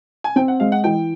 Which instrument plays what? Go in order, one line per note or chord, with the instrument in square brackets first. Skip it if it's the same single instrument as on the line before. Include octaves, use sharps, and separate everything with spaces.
[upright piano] G#5
[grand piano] C4 [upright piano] G5
[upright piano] F#5
[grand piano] G#3 [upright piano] F5
[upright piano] F#5
[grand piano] E3 [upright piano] G5